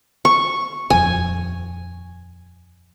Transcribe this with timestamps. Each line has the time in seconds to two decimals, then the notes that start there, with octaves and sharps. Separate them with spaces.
0.25 C#6
0.90 D#1 F2 G#5